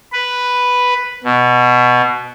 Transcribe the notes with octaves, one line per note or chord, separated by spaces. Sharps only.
B4
B2